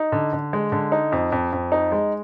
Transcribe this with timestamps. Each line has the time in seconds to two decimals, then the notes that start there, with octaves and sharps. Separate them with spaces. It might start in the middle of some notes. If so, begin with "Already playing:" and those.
Already playing: D#4
0.12 D3
0.33 D3
0.53 G#3
0.72 D3
0.92 D#4
1.12 F2
1.32 F2
1.53 F2
1.72 D#4
1.92 G#3